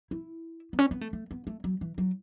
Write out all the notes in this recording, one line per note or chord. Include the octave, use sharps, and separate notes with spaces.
E4
B3
C#4
B3
A3
A3
B3
A3
F#3
E3
F#3